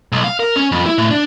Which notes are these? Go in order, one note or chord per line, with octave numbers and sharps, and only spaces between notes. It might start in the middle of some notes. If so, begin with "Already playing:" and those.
B1
F5
A#4
C#4
F2
E4
A2
D4